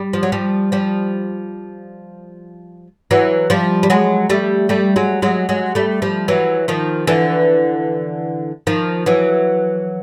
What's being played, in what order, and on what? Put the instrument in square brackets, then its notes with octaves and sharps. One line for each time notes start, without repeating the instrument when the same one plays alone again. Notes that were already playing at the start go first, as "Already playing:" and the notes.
Already playing: [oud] G3
F3
F#3
F3 G3
F3 G3
E3 F#3
F3 G3
G3
F#3 G#3
G3 A3
G3 A3
F#3 G#3
F#3 G#3
F#3 G#3
G3 A3
F3 G3
E3 F#3
D#3 F3
D3 E3
D#3 F3
E3 F#3